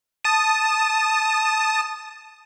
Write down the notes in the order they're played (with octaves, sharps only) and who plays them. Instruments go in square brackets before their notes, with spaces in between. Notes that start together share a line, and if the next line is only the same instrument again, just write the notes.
[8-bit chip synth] A5 D#6